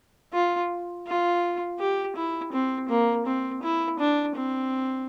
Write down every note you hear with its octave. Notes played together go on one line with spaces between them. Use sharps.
F4
F4
G4
E4
C4
A#3
C4
E4
D4
C4